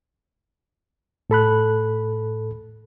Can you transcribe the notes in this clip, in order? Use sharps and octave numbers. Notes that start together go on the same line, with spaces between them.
A2 A4 B5 F#6